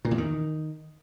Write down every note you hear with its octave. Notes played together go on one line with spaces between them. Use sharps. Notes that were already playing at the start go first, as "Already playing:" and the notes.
A#2
E2
D#3